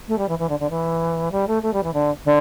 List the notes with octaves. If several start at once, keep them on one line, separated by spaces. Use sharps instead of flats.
A3
G3
E3
E3
D3
D3
E3
G3
A3
A3
G3
E3
D3
D3